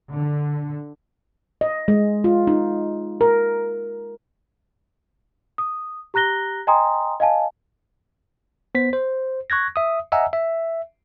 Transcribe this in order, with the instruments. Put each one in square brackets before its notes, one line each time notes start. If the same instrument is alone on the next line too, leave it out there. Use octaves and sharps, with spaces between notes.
[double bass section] D3
[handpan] D#5
G#3
F4
D#4
A#4
[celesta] D#6
G4 A#5 F#6 A#6 G7
D#5 G5 G#5 A#5 C6 D#6
D#5 F5 G#5 A5
[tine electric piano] B3 C5 B6
C5
C#6 F#6 G#6 A#6
E5 D#6
D#5 E5 F#5 G#5 A#5 E6
E5